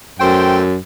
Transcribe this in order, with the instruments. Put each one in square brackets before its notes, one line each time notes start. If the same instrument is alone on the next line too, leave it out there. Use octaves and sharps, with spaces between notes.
[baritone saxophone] F#2 [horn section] A3 C5 G5